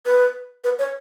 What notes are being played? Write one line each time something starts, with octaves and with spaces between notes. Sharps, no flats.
B4
B4
C#5